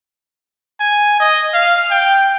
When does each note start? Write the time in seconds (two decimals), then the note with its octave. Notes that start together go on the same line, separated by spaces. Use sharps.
0.80 G#5
1.20 D#5
1.54 F5
1.91 G5